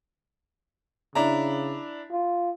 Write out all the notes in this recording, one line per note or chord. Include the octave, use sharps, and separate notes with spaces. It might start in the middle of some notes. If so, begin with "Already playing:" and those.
C#3 D4 E4 A#5
F4